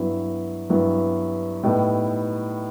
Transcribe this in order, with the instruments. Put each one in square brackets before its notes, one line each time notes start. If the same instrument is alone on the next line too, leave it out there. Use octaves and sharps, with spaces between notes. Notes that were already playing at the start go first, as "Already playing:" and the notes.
Already playing: [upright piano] G2 F#3 B3 E4
G2 F#3 B3 E4
A2 G3 B3 D#4 A4